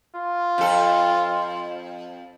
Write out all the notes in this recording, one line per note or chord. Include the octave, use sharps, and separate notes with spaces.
F4
F2 A4